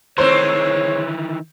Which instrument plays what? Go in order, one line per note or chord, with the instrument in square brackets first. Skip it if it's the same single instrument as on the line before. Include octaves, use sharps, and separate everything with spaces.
[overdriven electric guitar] D#3 E3 [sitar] G#3 A3 C4 [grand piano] C5 [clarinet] C#5